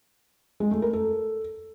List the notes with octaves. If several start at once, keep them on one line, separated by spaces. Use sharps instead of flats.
G#3
A3
A#4
A4